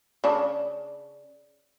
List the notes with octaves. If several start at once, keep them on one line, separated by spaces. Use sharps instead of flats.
C#3 D4